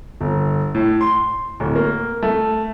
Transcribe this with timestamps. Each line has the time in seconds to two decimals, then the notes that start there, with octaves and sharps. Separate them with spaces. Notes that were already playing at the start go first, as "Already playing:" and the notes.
0.21 G1
0.75 A2
1.01 C6
1.60 D1
1.76 A#3
2.23 A3